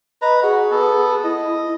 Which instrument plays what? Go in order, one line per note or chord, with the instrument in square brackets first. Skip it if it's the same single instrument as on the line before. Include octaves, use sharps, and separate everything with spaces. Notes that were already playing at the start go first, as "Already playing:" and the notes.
[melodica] B4 A#5 [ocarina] D#5
[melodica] F#4 [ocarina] G#4
[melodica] B3 A4
[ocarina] E4 [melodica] D#5